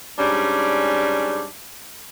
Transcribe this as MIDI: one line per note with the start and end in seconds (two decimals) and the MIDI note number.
0.19 1.46 44
0.19 1.46 55
0.19 1.46 61
0.19 1.46 62